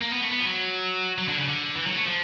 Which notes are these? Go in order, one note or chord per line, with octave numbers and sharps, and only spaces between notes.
A#3
B3
A3
B3
F3
F#3
F#3
D3
C#3
D3
E3
F#3
A3
F3